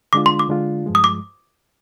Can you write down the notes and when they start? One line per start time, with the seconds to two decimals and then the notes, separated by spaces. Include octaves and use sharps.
0.13 D3 G#3 D4 F4 D6
0.26 C6
0.39 D6
0.49 D3 G#3 D4 F4
0.86 G2 F3 G#3
0.95 D#6
1.04 D6